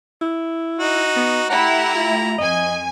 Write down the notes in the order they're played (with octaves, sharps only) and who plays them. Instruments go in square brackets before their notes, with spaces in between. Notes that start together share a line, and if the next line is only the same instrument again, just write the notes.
[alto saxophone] E4
[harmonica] D#4 F#4
[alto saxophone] B3
[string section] A3 E4 G4 [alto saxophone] F#5 [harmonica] A#5
[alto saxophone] F4
[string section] F2 G#5 [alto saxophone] D#5